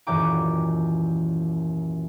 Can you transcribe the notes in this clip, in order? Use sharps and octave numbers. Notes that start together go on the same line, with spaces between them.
D#1 F#2 E3 G5 A#5 D6